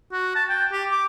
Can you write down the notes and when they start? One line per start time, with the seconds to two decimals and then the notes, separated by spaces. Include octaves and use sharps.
0.12 F#4
0.35 A5
0.49 G5
0.72 G4
0.91 D6